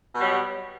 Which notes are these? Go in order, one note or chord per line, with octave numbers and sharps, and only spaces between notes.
B2 F#3 G3